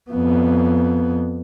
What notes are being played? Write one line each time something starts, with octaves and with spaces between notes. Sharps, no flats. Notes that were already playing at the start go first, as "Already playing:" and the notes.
F2 B3